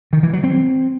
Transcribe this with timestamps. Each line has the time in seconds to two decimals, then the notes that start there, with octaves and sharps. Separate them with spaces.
0.13 D#3
0.23 E3
0.33 F#3
0.44 C4